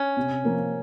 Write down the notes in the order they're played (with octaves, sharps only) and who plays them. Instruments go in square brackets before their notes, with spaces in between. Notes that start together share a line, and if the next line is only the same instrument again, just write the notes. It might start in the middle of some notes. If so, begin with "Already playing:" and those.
Already playing: [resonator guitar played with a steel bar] C#4
[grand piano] C3
F3 A#3